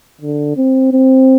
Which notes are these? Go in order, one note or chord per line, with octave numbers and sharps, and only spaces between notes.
D3
C4
C4